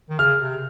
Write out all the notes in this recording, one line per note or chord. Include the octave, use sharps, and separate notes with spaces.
D#3
C#3 F6
C3